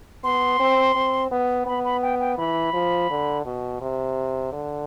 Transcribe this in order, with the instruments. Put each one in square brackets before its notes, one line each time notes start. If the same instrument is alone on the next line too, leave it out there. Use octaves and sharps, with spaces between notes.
[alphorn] B3 [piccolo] C6
[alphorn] C4
C4
B3
[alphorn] B3 [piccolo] B5
[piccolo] B5
G5
G5
[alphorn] E3 [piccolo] B5
[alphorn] F3
D3
B2
C3
D3